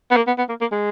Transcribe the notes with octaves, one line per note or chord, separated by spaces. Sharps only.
B3
A#3
B3
B3
A#3
A#3
G#3